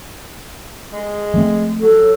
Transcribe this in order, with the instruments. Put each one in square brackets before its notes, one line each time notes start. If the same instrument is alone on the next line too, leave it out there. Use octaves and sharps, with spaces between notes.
[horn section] G#3
[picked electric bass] F3 A3 C4
[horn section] F#3 [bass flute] A4